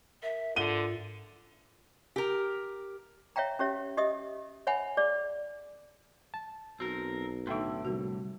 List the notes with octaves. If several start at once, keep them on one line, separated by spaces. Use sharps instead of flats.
A#4 E5
G#2 D3 F4 C6 D#7 G7
G4 A#4
C#5 E5 F5 G5 A#5
C#4 G4 C#5 E5
G4 D#5 E5 D#6
C#5 E5 F#5 G#5 B5
G#4 D5
A5
B1 C4 F#4 A#4
A2 D3 D#4 A4 E5 G5 C6
C3 G3 F#4 A#4